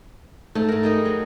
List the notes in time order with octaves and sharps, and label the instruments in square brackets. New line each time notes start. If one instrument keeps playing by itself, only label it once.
[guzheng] G#2 E5 A5 [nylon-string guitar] A3
[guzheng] G#2 A#4
G3 G#3 D#4
F#3